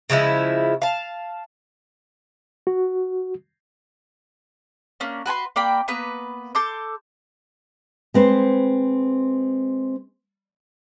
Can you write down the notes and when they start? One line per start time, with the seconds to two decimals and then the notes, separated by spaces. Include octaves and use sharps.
0.10 C#3 F3 G#3 E4
0.82 F5 A5
2.67 F#4
5.00 A#3 C#4 D4
5.26 F#4 B4 G#5 C6
5.56 A#3 D5 G5 B5
5.88 A#3 B3 B4
6.55 A4 C6 D6 G6
8.14 G#3 C4 B4 C5